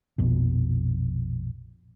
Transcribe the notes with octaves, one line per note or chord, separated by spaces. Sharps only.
A#1 F2 B2